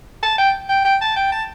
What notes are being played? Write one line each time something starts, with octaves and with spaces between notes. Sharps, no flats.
A5
G5
G5
G5
A5
G5
A5